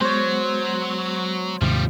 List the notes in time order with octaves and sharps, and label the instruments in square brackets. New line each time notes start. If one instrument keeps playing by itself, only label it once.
[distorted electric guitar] F#3 [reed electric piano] G#3 B3 [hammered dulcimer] C5 C#5
[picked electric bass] D#2 G#2 C3 [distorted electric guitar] F3 G3